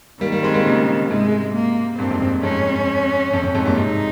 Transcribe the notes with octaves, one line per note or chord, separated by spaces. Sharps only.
D#3 G3 A#3
G3 A#3
G#3 C4
G3 A#3
A#2 C#3
G#2 C3 G#3
A#3
G2 A#2 C4
F2 G#2
F2
F2 G#2 C#4
F2
F2
F2 G#2
G2 A#2
G#2 C3 D#4